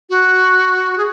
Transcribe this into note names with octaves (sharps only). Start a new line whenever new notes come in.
F#4
G#4